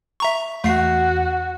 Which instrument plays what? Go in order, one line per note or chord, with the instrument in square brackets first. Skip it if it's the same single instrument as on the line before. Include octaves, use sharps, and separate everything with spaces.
[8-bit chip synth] E5 A#5 C#6
[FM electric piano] E2 [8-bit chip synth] A3 C7 [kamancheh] F#4